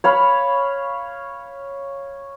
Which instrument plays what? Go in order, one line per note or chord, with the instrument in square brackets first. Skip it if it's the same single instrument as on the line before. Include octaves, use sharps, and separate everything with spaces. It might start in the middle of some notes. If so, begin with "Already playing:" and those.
[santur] C#5 F5 B5